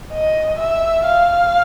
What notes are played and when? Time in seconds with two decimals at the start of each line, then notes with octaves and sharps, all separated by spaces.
0.13 D#5
0.59 E5
1.06 F5